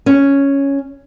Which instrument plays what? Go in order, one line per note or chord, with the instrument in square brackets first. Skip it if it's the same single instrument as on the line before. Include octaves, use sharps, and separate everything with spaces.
[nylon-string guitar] C#4